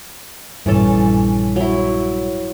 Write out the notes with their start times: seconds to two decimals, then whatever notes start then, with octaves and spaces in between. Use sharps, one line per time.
0.66 A#1 G2 E3 C#4 A4
1.56 F#3 E4